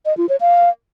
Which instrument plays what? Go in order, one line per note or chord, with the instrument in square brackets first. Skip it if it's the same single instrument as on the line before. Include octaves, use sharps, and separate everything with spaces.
[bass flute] D#5
F4
C#5
F5